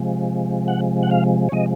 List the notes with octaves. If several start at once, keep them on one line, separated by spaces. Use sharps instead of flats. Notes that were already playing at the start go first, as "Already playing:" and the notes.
Already playing: C3 F3 G#3
F#5
F#5
F5
C#5
C3 F3 G#3 D#5